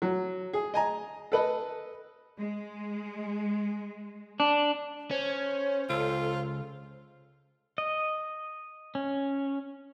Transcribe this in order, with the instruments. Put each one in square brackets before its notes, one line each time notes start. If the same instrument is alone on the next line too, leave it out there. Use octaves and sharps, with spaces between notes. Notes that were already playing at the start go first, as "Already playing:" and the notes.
[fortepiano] F#3
G#4
D#5 G#5 A#5
A4 B4 D#5
[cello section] G#3
[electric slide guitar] D4
[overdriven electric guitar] C#4 [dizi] C5 [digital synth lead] C#5
[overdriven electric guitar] C#2 [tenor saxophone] F4 [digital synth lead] A4
[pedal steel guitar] D#5
C#4